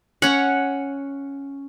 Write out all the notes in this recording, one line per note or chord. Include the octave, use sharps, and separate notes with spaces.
C#4 C#5 F#5